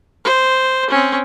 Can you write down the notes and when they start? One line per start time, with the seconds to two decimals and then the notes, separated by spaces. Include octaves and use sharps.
0.25 C5
0.90 C4 C#4